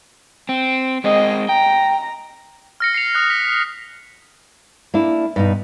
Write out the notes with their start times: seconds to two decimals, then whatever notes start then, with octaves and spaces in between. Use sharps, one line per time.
0.49 C4
1.04 G#3 C4 D#5
1.49 G5 A#5
2.80 F6 A#6 C#7
2.94 C7 C#7 F7
3.15 D#6 F#6
3.30 B6
4.94 A#3 D4 E4
5.36 G2 B2 D#4